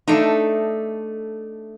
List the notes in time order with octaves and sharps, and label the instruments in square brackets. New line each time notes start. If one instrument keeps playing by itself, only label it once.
[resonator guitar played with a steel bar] A3 D4 D#4